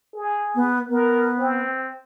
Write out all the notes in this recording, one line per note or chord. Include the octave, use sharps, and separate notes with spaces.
G#4
B3
B3 A#4
C4